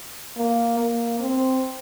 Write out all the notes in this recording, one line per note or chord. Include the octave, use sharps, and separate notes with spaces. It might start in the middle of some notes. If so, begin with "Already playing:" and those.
A#3
A#3
C4